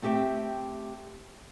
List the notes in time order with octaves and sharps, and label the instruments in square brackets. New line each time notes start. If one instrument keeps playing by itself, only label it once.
[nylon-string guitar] A3 C4 G4 E5 G5